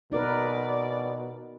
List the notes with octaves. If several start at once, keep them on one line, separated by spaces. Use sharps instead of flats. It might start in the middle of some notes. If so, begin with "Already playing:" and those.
B2 D#4 A#4 B4 D5